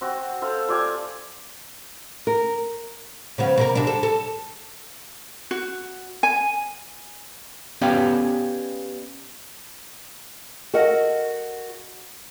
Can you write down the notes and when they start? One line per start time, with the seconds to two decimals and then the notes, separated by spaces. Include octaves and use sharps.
0.01 C4 F#4
0.42 A4 C5 F5
0.68 F4 G4 D5 G#5
2.27 A#4
3.38 C#3 F3 B3
3.58 B2 A#3 A#4
3.75 C3 D4
3.87 A4
4.03 A4
5.51 F#4
6.23 G#5
7.81 B3 C#4 G4 D5 F5
10.73 F#4 A4 A#4 D#5 F5 F#5